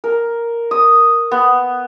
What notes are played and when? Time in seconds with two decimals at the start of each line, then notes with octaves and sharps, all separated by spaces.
0.04 A#4
0.71 D#6
1.32 B3